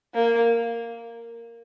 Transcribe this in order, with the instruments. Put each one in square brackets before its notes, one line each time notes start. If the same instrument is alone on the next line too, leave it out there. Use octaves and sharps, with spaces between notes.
[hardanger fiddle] A#3